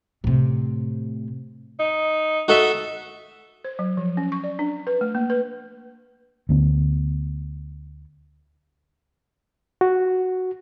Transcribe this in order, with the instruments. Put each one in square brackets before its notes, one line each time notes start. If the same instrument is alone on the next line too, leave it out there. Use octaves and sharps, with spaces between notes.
[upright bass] A2 C3
[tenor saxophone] D#4
[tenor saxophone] D#4 [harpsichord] F#4 A4 E5
[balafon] C5
F#3
F3
C#4
C#6
D5
D4
B4
A3
A#3
B4
[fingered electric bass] D2 D3 B3
[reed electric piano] F#4